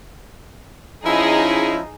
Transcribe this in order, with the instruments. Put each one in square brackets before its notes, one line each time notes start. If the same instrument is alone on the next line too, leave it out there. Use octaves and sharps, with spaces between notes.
[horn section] F3 C#4 E4 [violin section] D#4 G#4